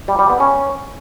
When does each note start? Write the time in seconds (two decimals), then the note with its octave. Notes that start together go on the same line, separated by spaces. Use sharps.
0.08 G3
0.19 G3
0.30 B3
0.40 C#4